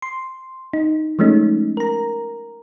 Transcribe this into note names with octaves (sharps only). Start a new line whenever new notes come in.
C6
D#4
F3 G#3 A3 C#4 D#4
A#4 A#5